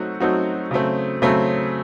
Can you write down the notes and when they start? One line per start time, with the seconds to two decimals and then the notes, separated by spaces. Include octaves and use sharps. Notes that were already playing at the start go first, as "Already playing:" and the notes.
Already playing: F#3 A3 C4 D#4 F#4
0.20 F#3 A3 C4 D#4 F#4
0.71 C#3 F#3 A3 C4
1.22 C#3 F#3 A3 C4